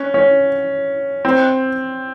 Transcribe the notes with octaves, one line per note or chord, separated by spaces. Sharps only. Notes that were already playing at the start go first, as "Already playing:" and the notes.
Already playing: C#4
C#4
C4